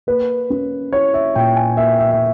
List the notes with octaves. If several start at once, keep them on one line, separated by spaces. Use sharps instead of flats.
A#3 B4
C#4
E4 C#5
E5
A#2 G5
G#5
A#3 E5
E5
E5